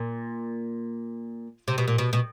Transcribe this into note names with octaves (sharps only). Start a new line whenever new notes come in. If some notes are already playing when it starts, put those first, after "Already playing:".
Already playing: A#2
C3
B2
A#2
B2
B2